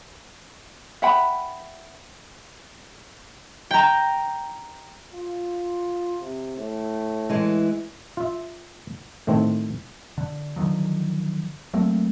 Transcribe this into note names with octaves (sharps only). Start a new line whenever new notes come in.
E5 F#5 G5 B5
G5 A#5
F4
C3
A2
E3 G#3
F4 E5
A2 D#3 A3 C4
D3
D3 D#3 F3 F#3
F#3 A3 A#3 C4